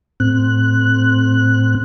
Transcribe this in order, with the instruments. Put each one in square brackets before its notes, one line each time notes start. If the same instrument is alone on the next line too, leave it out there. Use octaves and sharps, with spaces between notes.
[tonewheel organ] A2 C4 F#6